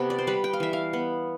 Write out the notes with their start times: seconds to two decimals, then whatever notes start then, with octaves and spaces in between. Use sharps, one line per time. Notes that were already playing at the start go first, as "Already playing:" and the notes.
Already playing: C3 B3 G4 A4
0.10 D5
0.19 C5
0.27 G3 B4
0.44 G5
0.53 F5
0.60 E3 E5
0.73 F5
0.93 B3